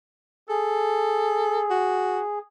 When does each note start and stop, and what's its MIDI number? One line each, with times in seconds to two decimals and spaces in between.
0.49 2.39 68
0.49 1.65 69
1.70 2.21 66